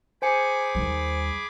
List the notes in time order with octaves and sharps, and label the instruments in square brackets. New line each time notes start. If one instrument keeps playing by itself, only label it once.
[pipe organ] G#4 B5 D6 [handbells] C5 G#5 C#7
[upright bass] D#2 G3